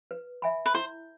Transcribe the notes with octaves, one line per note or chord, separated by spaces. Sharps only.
B4
E5 G#5 B5
B4
E4 C5